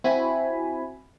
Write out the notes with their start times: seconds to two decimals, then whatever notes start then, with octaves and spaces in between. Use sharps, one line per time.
0.04 C4 E4 F#4 G#5 B5